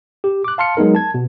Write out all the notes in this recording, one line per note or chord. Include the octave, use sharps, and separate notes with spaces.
G4
D6 F#6
F5 A5 C6 F6 C#7
F#3 G#3 B3 D#4 A#4
A5 G#6
B2